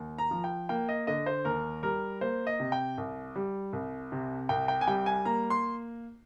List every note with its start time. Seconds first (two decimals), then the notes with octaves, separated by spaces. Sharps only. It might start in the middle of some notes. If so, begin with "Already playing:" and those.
Already playing: D#2
0.18 A#5
0.31 F3
0.44 G5
0.69 A#3 G5
0.89 D#5
1.07 D3 D#5
1.26 C5
1.45 D#2 A#4
1.83 G3 A#4
2.21 A#3 C5
2.47 D#5
2.60 C3
2.72 G5
2.98 C2
3.36 G3
3.73 C2
4.12 C3
4.49 C2 G5
4.68 G5
4.81 G#5
4.87 G3 G5
5.06 G#5
5.25 A#3 A#5
5.50 C6